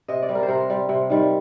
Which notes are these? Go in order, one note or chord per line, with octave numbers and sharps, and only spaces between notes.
C3 D#5
D5
G3
A#4
C5
C3 A#4
G3
C3
D#3 G3